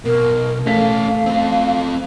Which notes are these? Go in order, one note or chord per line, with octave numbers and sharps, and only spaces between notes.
B1 B2 A#4
A3 C#4 A4 F5 B6
C4 A4